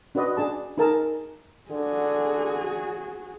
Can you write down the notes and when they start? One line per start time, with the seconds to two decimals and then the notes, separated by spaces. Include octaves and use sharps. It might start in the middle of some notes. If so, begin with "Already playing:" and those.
0.15 D4 F#4 B4 D5 D#5
0.37 D4 G#4 A5
0.78 D#4 G#4 A#4 A5
1.71 D3 F#4 G#4